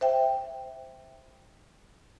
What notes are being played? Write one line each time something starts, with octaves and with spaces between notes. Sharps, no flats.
C5 E5 G5